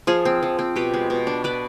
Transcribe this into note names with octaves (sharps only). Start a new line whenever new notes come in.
F3 F4 G#4
C4
F3
C4
B2 G4 B4
G#3
B2
D4
D4 B4 D5